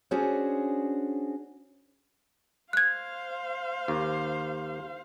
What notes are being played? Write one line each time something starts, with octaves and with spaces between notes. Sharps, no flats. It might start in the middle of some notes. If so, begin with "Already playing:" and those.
C#4 D4 F#4 G#4 C5 C#5
C5 F5 F#6 G#6
D#2